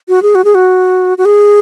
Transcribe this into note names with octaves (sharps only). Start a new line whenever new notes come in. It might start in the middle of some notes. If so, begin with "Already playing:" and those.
F#4
G#4
F#4
G#4
F#4
F#4
G#4